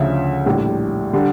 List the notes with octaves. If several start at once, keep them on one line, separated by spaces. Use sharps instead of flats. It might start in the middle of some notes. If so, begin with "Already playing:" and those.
Already playing: D2 C#3 F3 E5
A#1 A2 G3
D3 G3